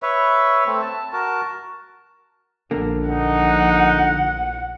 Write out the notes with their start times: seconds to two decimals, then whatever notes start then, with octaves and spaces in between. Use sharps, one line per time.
0.03 B4 C#5 E5
0.67 A3 C4
0.82 A5
1.13 F#4 A#4 A5
2.71 A#1 D3 A#3
3.09 D#4 F#5